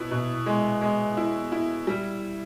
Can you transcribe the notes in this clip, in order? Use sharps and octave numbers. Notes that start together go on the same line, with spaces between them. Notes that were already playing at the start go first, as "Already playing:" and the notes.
Already playing: B2 B3 E4
B2
G#3
G#3
E4
E4
G3